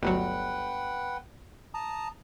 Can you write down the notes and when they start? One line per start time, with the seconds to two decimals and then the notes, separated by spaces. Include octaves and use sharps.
0.03 G1 D2 F#3 B4 F#5 G5
1.74 A5 A#5 D#6